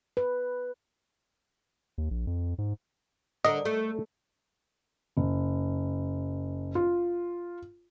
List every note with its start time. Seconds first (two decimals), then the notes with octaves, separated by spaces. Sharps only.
0.17 B4
1.98 D#2
2.11 A#1
2.27 F2
2.58 G#2
3.45 D3 A#4 D#5
3.65 A3
5.17 F#1
6.75 F4